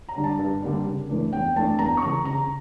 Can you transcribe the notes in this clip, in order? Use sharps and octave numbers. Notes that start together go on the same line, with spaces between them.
A#5
D3 G3 D4
A5
G2
D3 G3 A#3 D4
C#3
E3 A3 D4
E2 G5
E3 A3 D4 A5
E2 A#5
C#6
C#3 E3 A#5
C#3 A#5